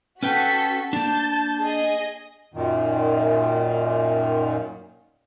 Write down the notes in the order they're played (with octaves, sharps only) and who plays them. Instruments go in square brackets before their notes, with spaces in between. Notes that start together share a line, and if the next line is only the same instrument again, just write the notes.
[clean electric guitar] C#4 B4 G5 [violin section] F#4 A4 B6
[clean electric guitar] A#3 D4 [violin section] A5 G6
[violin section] G#4 D#5
[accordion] F#2 A#2 D#3